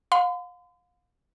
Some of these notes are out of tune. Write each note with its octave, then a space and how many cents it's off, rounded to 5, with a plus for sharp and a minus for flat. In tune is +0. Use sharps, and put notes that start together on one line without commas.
F5 +35 C6 -45